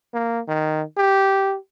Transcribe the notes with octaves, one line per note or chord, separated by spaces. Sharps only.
A#3
D#3
G4